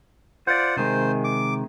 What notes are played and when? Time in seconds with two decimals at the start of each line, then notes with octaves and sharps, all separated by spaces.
0.47 F4 C5 D5 F#5
0.77 C3 D#3 G#3 C5
1.24 D6